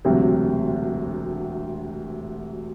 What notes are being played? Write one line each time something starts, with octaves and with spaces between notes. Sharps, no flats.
E1 D2 C3 F#3 C4